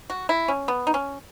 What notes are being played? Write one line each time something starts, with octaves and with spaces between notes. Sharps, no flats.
F#4
E4
C#4
B3
D#4
C#4